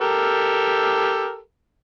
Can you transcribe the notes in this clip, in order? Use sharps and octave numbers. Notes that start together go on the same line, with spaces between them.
G4 A4 A#4